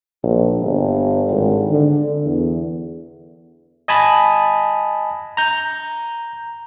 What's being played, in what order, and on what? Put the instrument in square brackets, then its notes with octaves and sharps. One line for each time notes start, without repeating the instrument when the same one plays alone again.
[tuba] A#1
G1
G#1
D3
E2
[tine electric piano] D#5 G#5 A5 B5
A#5 G6